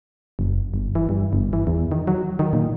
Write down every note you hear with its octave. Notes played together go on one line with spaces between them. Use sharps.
F#1
G1
E3
G2
G1
E3
E2
D#3
F#3
D#3
A#2